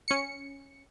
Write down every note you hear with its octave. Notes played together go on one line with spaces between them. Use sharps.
C#4 C#7